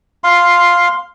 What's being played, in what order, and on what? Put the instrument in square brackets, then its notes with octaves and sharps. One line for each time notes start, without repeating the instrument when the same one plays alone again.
[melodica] F5 C6